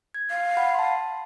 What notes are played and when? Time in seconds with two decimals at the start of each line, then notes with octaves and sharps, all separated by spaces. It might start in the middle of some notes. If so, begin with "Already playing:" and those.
0.14 G#6
0.31 F5
0.57 F#5 B5
0.74 A5 C6